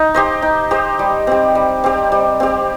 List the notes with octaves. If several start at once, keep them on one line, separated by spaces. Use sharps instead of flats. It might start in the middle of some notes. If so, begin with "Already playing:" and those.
Already playing: D#4
G4 C5 D#5
D#4
G4 C5 D#5
G3
C4 G4
G3
C4 G4
G3
C4 G4